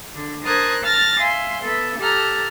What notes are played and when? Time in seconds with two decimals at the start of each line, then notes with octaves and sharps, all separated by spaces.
0.15 D3
0.46 A#4 C5 A5 D#6 F#6 G#6
0.83 A5 F6 A6 A#6
1.20 E5 F5 G#5 C6
1.63 B3 A4 E5
1.99 G4 A4 A5 A#5 F6